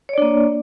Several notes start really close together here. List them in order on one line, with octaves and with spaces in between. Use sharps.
C#5 D5 D4 A#3